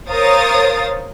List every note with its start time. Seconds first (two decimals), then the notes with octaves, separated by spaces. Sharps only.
0.10 A#4 C5 C#5 F5 D#6 A6